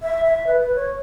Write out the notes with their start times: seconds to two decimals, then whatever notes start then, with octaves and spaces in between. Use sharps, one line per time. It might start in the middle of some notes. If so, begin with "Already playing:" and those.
0.03 E5
0.25 E5
0.47 B4
0.60 B4
0.75 C#5